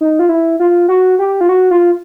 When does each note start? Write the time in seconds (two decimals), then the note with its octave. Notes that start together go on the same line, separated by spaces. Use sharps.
0.01 D#4
0.19 F4
0.29 E4
0.60 F4
0.88 F#4
1.19 G4
1.41 F4
1.49 F#4
1.71 F4